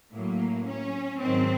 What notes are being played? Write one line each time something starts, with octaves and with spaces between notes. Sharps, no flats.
A2 F#3 A#3
C#4
G#2 D#3 F#3 C4